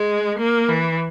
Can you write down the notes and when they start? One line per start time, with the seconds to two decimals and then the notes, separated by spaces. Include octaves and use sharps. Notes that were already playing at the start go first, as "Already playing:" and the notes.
Already playing: G#3
0.39 A#3
0.69 E3